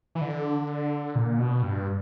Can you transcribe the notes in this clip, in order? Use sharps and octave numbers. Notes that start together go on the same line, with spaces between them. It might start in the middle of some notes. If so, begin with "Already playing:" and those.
E3
D3
A#2
B2
G2